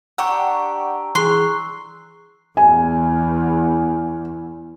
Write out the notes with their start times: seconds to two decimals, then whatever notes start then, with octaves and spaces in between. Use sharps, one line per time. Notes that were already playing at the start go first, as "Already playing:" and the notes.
0.18 D4 G4 F#5 G5 A#5 C#6 E6
1.15 E3 G#4 C6 C#6 F#6 C7
2.57 E2 G#5